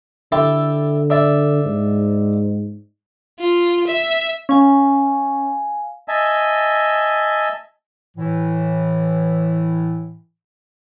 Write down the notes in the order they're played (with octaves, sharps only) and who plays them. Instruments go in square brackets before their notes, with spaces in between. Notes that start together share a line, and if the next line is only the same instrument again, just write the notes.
[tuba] D3 [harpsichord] E4 G4 A4
[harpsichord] D4 E5 A5
[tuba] G#2
[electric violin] F4
E5
[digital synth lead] C#4 [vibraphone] F5 G#5
[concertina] D#5 E5 G#5 A5
[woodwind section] A2 E3